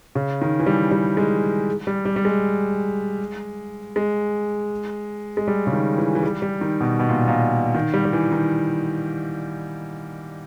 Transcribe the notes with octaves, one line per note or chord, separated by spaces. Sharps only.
C#3
D#3
E3
G3
G3
G#3
G3
G3
G3
G#3
G#3
G#3
G3
C#3
D#3
E3
E3
G3
G3
D#3
B2
B2
A#2
A#2
D#3
G3
G3
E3
D#3